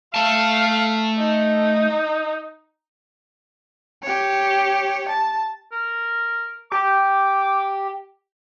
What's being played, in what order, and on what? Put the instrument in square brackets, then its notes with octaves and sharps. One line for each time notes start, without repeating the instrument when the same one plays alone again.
[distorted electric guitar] A3 A5 [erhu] F5
[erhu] D#4
[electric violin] G4 C#5
A5
[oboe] A#4
[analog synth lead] G4 [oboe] D6